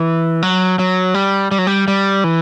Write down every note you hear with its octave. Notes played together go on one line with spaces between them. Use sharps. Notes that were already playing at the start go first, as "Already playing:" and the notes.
Already playing: E3
F#3
F#3
G3
G3
F#3
G3
G3
E3